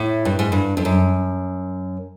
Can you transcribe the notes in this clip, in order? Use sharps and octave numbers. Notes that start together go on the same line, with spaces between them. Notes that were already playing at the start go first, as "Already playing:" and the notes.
Already playing: A2
G2
G#2
G2
F2
F#2